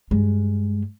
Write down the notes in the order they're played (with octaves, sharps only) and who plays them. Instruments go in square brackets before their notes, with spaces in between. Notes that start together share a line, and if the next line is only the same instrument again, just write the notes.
[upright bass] G2 G#3